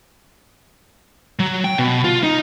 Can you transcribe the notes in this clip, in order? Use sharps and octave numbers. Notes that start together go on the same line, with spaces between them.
F#3
G5
B2
F4
D#4